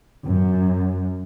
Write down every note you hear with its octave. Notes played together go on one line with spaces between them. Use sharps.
F#2